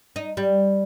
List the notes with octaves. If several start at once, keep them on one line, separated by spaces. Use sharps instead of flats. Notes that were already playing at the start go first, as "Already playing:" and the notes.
D#4
G3